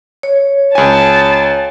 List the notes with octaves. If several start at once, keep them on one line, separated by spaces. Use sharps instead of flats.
C#5
C#2 G#5 A5